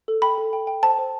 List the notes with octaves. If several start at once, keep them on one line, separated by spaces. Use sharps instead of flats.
A4
G5 B5
A4
G5
G5
C5 A5
C5